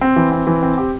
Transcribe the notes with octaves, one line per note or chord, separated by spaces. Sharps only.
C4
E3
C4
E3
C4
G4